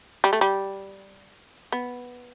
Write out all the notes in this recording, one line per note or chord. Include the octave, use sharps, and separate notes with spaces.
G3
A3
G3
B3